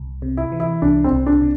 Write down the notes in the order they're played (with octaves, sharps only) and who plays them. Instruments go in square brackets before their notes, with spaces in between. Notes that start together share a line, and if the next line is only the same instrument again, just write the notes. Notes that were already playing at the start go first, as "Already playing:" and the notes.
Already playing: [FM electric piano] C2
C3
[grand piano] E4
[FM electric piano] E3
[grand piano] E4
[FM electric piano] C2 [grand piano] D4
[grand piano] C4
[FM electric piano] C2
[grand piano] D4
[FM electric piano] C3